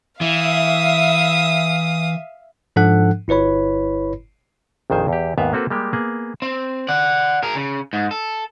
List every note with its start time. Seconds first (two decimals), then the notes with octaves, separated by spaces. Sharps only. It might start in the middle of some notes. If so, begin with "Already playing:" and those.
0.21 E3 E5 F5 D#6
2.76 G#2 F3 D4 A4 F#5 F#6
3.28 G1 E4 B4 C#5 B5
4.90 A#1 F2 D#3 C5 G#5
5.08 E2 G4
5.38 D#2 G#2 B3 B4 E5 F5
5.53 A#3 C4 F#4 A4 B4
5.70 G3 G#3 A#3 G4
5.93 A#3 B3 G#4
6.42 C4
6.88 D5 F#5
7.43 G#4 A#4
7.55 C#3
7.93 G#2
8.11 A4